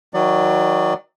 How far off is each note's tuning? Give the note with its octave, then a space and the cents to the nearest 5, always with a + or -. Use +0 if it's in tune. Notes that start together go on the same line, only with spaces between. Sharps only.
D#3 +35 F#3 +0 D5 +25